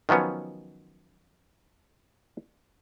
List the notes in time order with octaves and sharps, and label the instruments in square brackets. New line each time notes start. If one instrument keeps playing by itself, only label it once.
[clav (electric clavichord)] D#3 F3 F#3 B3 C#4